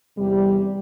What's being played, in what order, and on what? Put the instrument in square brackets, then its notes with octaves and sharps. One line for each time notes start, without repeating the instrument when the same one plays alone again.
[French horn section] E2 C3 G3